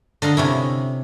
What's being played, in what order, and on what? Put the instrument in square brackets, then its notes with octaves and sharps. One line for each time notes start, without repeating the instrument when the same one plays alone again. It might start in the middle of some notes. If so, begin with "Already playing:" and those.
[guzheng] D3 D#5 F5 A#5
C3 C#4 E4